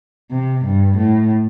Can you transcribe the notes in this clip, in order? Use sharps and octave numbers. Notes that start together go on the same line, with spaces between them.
C3
G2
A2